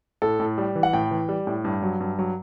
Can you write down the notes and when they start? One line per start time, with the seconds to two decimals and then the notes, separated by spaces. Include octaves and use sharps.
0.22 A2 A4
0.40 A2
0.58 G3
0.75 E3
0.83 F#5
0.93 A2 G5
1.11 E3
1.29 G3
1.47 A2
1.65 G2
1.82 F#3
2.00 G2
2.19 F#3